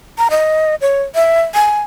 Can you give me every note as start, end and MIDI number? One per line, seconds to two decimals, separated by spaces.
0.18 0.28 82
0.31 0.75 75
0.81 1.03 73
1.15 1.42 76
1.54 1.81 80